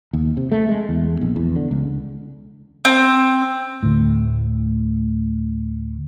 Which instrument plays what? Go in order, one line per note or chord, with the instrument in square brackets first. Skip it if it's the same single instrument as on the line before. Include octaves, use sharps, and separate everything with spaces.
[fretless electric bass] D#2
C3
A3
G#3
E2
A#1
E2
D3
C#2
[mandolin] C4
[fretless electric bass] D2 A2